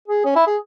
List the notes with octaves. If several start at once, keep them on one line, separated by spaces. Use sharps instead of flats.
G#4
C#4
E4
G#4